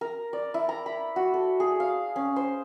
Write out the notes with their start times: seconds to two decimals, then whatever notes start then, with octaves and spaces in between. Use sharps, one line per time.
0.01 A#4
0.33 D5
0.54 E4
0.69 A#5
0.86 B5
1.16 F#4
1.34 A4
1.60 G#4
1.80 F5
2.16 C#4
2.36 C5